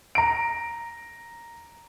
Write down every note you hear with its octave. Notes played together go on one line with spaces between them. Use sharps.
A#5 D7